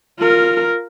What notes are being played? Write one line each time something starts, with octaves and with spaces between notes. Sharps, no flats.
F4 A#4